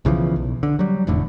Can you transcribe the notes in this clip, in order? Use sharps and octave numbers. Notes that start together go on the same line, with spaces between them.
B1 C#3 E3 F3
B1
D3
F#3 G3
F1 E2 A2 D3